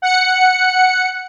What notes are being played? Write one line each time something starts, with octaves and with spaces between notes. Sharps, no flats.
F#5 C#7